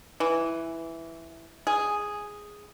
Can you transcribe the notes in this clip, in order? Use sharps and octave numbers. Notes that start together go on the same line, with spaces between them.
E3
G#4